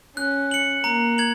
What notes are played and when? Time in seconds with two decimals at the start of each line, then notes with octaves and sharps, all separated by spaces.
0.17 C#4 F#6
0.51 C#7 F#7
0.84 A#3 A#5
1.18 G#6 F#7